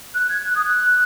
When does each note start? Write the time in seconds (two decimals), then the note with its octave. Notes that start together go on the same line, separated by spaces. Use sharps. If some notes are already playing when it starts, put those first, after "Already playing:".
0.14 F#6
0.29 G#6
0.45 F#6
0.55 D#6
0.64 F#6